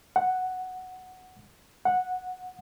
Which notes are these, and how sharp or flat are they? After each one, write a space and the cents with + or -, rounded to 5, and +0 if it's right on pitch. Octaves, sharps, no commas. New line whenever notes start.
F#5 +0
F#5 -10